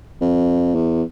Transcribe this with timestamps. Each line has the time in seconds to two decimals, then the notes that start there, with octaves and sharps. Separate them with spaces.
0.21 F2
0.75 E2